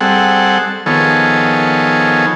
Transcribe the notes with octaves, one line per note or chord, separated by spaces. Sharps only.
G3 C4 G#4 A4 F#5
D#3 F3 B3 G#4 A4 C#5